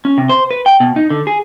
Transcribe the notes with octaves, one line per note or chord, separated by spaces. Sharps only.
C#4
C3
C5
B4
G5
B2
D#4
D3
G#4